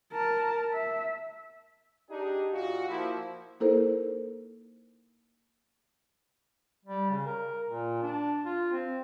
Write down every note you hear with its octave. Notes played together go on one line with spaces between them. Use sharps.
A#4 A5
E5
D4 D#4 G4 G#4
A#2 F4 F#4
F3 A#3 E4
A#3 D#4 E4 A4 A#4 C5
G3
C#3
A#4
A#2
D4
F4
C4